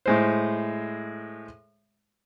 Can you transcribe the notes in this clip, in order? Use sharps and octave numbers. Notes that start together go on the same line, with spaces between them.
A2 G#3 C5